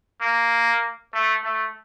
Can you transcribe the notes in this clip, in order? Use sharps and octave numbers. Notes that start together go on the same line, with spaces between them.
A#3
A3
A3